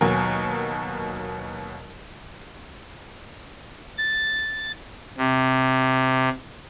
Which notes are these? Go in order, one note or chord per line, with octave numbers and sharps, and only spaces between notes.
D#2 B2 F#3 A#4 G#5
A6
C3